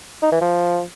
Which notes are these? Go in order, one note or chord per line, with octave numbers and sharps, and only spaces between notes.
D#4
E3
F3